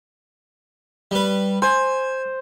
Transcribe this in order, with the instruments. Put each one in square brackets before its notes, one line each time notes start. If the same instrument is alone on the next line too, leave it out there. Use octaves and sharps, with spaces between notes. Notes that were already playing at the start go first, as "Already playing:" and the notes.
[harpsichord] G3 B4
[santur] C5 [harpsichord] G#5